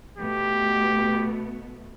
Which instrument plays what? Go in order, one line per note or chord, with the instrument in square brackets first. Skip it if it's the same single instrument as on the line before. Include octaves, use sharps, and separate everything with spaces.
[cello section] B2 A3 B3 [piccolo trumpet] G4